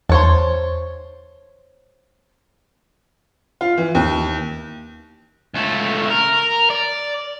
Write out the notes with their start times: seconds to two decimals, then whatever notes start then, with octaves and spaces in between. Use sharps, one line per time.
0.09 E2 C5 C#5 A5
3.61 F4
3.78 E3
3.95 D#2
5.54 C#2 A3
6.11 A#4
6.70 D5